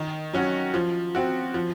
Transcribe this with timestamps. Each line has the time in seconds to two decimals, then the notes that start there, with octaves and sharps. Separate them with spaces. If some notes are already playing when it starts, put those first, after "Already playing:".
Already playing: D#3
0.33 F#3 C#4 F#4
0.74 F3
1.15 C4 F#4
1.54 F3